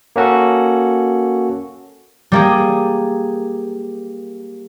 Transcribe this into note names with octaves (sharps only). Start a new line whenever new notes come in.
A#3 C#4 F#4 A4
G3 A#3 G#4